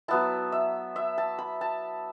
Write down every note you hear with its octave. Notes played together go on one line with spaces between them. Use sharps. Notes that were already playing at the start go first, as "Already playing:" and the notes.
F#3 B3 E4 A5
E5
E5
A5
B5
A5